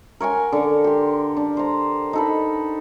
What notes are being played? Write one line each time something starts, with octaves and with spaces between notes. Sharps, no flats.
A#4 C#5 F#5 G#5
D3
G4 C6
D4
C5 A#5
D#4 A4 B4